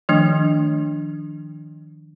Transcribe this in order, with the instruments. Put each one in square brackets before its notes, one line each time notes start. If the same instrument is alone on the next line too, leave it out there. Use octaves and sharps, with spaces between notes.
[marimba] D#3 F3 A3 D4